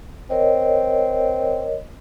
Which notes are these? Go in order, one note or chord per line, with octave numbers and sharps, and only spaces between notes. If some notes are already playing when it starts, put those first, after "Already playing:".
C4 A#4 C#5 D#5